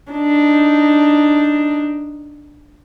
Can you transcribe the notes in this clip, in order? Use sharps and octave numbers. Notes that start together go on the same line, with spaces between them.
D4 D#4